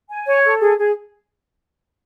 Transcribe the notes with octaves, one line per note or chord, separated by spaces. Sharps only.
G#5
C#5
A4
G#4
G#4